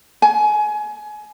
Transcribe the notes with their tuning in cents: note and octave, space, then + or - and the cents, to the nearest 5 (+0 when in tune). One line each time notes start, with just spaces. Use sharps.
G#5 +25